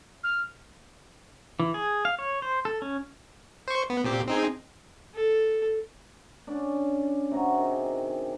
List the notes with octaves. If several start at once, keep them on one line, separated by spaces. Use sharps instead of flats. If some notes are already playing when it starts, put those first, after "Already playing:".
F6
E3
G#4
F5
C#5
C5
A4
C#4
C5 C#6
B3
A#2 C4 G4
C4 D#4 G#4
A4
C#4 D4
C3 F#4 A#5
D#3 G#4